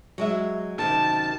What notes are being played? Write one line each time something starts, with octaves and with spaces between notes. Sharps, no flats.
F#3 G#3 E5
F#2 C3 D#3 A5